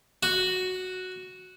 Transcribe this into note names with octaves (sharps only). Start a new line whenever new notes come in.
F#4